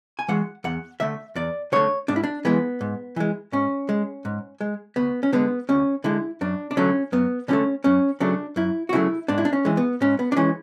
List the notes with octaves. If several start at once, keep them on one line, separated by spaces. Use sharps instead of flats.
G#5
E3 G#3 F#5
E2 F#5
D3 A3 E5
E2 D5
D3 A3 C#5
G#2 D4
E4
D4
E3 G#3 B3
G#2
E3 G#3
G#2 C#4
G#3
G#2
G#3
D2 B3
C#4
D3 G#3 B3
D2 C#4
D3 G#3 E4
F#2 D4
D4
D3 F#3 A3 C#4
F#2 B3
D3 F#3 A3 C#4
F#2 C#4
C#3 F#3 A3 D4
F#2 E4
F#4
C#3 F#3 A3 E4
G#2 D4
E4
D4
C#4
E3 G#3
B3
G#2 C#4
B3
D4
E3 G#3 C#4